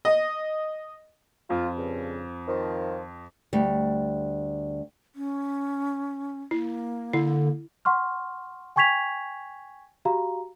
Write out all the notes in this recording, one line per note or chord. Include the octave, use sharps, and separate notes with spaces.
D#5
F2 F4
G2 C#3
D#3 F3
D2 G3
C#4
A#3 E4
D3 E4
F#5 C6 C#6 F6
G5 G#5 C#6 G#6 B6 F7
F#4 G4 F5 A#5